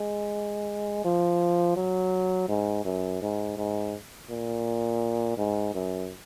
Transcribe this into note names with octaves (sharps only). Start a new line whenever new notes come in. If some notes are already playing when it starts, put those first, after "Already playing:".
Already playing: G#3
F3
F#3
G#2
F#2
G#2
G#2
A#2
G#2
F#2